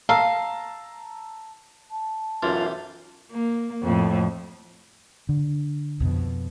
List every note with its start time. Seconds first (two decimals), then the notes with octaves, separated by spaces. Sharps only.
0.09 F5 A5 A#5 E6
1.91 A5
2.43 B1 F#2 E3 F4
3.31 A#3
3.83 F2 A2
5.29 D3
6.00 F2 B2